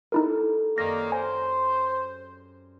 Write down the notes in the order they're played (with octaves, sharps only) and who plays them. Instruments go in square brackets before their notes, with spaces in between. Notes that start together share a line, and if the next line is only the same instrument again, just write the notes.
[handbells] D#4 E4 A#4 [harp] G4 A4
[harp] F#2 C4 D5 [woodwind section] D#3 A#3 [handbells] A#6
[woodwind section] C5 [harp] C#5 [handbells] G#5